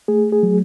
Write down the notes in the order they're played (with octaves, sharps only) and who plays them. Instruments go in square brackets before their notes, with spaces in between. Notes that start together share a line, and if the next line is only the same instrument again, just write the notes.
[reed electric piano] A3 G#4
G#4
F#3